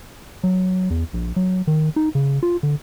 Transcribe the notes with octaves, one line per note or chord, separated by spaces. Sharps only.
F#3
E2
A#1
F#3
D#3
D#4
C#3
F4
D3